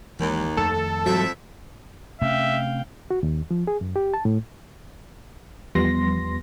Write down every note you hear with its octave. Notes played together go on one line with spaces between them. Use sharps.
D#2 E3 G#3
F2 D#3 A3 A4
F2 G#2 E3 F#3 G3 C4 E5
C3 A3 C#4 E5 F5 G5
F#4
D#2
F3
G#4
F#2
G4
A5
A2
E2 F3 G3 B3 C6 A#6